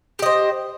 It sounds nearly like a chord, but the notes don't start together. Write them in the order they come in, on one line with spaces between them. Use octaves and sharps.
G4 D#5 C5